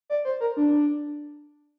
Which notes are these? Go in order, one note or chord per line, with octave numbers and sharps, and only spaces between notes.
D5
C5
A#4
D4